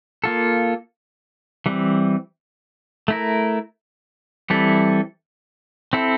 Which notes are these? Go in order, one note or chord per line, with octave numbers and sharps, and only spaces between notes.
A#3 F4 A4
E3 G3 C4
A3 E4 A#4
E3 G3 C4 E4 A4
C4 E4 A4